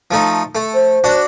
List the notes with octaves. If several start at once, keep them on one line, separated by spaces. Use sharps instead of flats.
F3 A3 D#4
A3
C5
D4 F#4